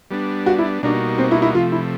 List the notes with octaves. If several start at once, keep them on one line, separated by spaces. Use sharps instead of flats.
G3 B3 D4
F#4
E4
B2 G3 A#3 D4 D#4 F#4
C4
E4
E4
C3 F3 A3 F4
E4